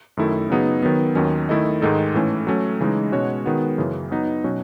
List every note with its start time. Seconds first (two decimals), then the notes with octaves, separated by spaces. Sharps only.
0.17 F#2 D#3 A3 E4 A4
0.50 C#3 F#3 B3 D#4 G#4
0.83 D#3 F#3 B3
1.15 D#2 D#3 F#3 C#4
1.49 D#3 A3 E4 A4 D#5
1.82 G#2 D#3 G#3 D#4 A4
2.14 A2 E3 A3 C#4
2.47 F#3 A3 C#4
2.81 C#3 E3 G#3 D#4
3.12 B2 G#3 C#4 F#4 C#5
3.46 D#3 G#3 B3 F#4
3.78 F#2 C#3 E3
4.11 F#3 B3 D#4
4.44 B2 F#3 C#4 F#4